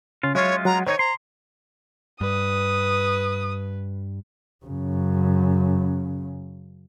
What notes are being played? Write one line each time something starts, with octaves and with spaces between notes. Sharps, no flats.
C#3 C#4 F4
F#3 G#3 C#4 F4 C#5 E5 F5
F#3 F#5 A#5
D#3 C4 D#4 C5 C#5 G#6
A#5 C6
G2 B4 D#6
F#2 C#3